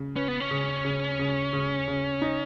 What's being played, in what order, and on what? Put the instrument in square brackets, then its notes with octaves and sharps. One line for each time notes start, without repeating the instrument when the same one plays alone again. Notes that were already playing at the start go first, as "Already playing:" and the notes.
Already playing: [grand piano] C#3
[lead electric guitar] C#4 [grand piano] B4
[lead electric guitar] B3
C#4
[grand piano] C#3
C#3
C#3
C#3
C#3
D#4